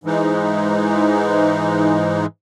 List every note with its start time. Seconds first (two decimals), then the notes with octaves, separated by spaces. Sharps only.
0.04 G#2 E3 G#3 D#4